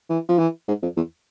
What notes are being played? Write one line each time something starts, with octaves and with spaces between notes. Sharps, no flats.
E3
F3
E3
G#2
F2
E2